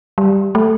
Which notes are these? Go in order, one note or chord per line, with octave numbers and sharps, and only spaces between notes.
G3
A3